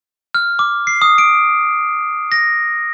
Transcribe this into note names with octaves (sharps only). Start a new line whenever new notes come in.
F6
D6
C7
D#6
D7
A#6